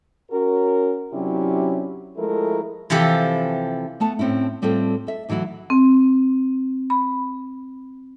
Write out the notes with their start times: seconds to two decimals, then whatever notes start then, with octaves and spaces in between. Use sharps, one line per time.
0.31 C#4 F#4 A#4
1.13 C3 F#3 C#4 D4 E4 G4
2.16 F3 G#3 A3 E4 A4 A#4
2.90 C3 E3 F3 G4 A4
4.00 A3 B3 A5
4.19 A2 C4 C#4 E4
4.62 A2 G3 C4 F4 A4
5.07 A4 E5
5.29 D2 E3 F#3 E4 F#4
5.70 C4
6.90 B5